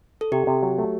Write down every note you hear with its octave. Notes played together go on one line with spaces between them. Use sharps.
A4
C3 G4
C3
F#3
A3